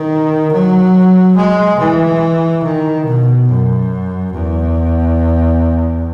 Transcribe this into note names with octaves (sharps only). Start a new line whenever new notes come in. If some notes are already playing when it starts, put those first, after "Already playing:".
Already playing: D#3
F#3
G#3
E3
D#3
B2
F#2
E2